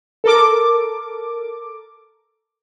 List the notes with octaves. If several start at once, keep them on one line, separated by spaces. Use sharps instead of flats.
A4 A#4 D6